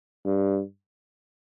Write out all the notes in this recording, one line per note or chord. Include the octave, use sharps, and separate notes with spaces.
G2